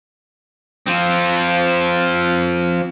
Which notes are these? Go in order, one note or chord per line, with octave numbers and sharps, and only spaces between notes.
F3 C4